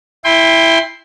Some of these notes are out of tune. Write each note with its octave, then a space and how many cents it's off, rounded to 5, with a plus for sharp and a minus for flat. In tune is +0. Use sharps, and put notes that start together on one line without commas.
E4 +0 G5 +30 C6 +0